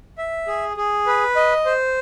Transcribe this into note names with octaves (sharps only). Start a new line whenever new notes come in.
E5
G#4
G#4
B4
D#5
C5